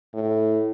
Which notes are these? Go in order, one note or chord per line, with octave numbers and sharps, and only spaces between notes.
A2